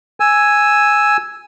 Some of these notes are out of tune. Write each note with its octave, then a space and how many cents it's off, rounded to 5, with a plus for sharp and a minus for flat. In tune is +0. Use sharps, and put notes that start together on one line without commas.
G#5 +0 E6 +0